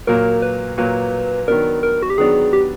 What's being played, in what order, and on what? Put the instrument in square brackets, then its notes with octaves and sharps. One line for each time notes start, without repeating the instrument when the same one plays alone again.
[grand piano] A#2 F#3 A#3 [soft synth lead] A#4
[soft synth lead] B4
[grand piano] A#2 F#3 A#3 [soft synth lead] B4
[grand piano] D#3 F#3 B3 D4 [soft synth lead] A#4
[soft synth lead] A#4
F#4
G4
[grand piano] D#3 F#3 B3 D4 [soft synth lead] G#4
[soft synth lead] G4